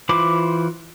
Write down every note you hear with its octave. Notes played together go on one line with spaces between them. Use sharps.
E3 F4 C5 B5 D6